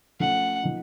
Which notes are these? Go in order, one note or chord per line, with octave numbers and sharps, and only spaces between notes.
F3 A3 C#4 F#5
F3 A#3 D#4